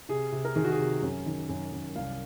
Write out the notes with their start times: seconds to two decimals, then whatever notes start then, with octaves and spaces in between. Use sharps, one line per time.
0.09 C3 G#4
0.32 C3
0.45 A#4
0.56 D#3 G#4
0.64 F#4
0.71 G#4
0.79 C3
1.02 F#2
1.26 D#3
1.49 F#2
1.72 F#2
1.95 C2 F5